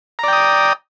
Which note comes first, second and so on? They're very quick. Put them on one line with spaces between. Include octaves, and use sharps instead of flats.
A#5 D5 G5 D#6